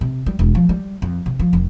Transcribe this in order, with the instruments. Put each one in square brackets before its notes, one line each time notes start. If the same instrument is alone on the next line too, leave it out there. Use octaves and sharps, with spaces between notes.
[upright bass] C3
G3
E1
F3
G3
F2
C3
F3
F1